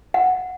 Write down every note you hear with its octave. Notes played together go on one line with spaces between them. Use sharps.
F#5